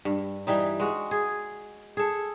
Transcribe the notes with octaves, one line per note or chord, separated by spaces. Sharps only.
G2
E3 G3 D#4
G#3 F#4
G#4
G#4 A4